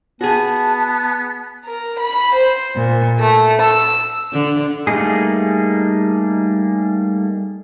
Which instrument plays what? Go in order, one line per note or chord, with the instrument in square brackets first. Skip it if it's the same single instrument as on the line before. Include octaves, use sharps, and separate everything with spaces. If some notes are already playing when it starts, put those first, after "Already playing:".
[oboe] B3 [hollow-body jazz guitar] F#4 G#4 [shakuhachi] A5
[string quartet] A#4
B5
C5
A#2
A3
E6
[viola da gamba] D3
[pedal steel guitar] G3 A3 A#3 D#4 G#4